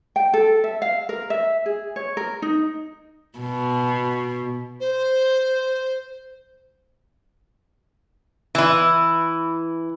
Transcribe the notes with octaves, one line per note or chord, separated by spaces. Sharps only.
G5
A4
E5
F5
A#4
E5
G#4
C#5
A#4
D#4
B2
C5
E3 E4